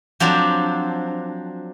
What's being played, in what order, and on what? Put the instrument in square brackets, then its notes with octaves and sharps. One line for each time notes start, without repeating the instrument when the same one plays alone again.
[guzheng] F3 F#3 C4 D4